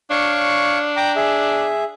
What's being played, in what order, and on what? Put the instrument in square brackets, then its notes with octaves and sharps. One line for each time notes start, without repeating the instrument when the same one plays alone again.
[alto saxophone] D4 [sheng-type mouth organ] C#5 F5 C#6
[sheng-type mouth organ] G5 A#5 D6
G#4 E5